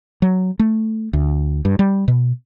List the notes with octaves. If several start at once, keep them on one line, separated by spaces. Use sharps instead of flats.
F#3
A3
D2
G2
G3
B2